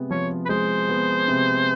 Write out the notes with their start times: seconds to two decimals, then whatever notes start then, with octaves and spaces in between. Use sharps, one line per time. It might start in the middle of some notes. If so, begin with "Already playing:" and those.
Already playing: C3 G#3 B3
0.11 F3 C#5
0.45 B4
0.49 G#3 C5
0.89 B3
1.28 C3